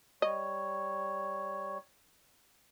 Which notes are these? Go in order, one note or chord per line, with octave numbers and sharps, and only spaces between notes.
G3 C#5 D#5